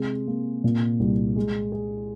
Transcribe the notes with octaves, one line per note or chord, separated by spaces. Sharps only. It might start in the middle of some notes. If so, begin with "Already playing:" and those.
Already playing: C3 G#3
A#3
A#2
C2
G#3
G#4